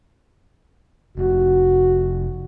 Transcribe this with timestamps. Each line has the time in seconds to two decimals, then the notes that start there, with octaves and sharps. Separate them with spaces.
1.17 F1 F#4